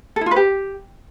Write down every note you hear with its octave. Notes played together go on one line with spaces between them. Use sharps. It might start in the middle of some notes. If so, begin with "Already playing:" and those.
A4
E4
F4
B4
G4